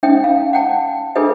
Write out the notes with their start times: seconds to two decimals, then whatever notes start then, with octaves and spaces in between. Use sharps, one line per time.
0.03 C#4 D#4 E5 G5
0.24 F5
0.53 F#5 G5 A5
1.15 D4 F4 G#4 A4 B4 E5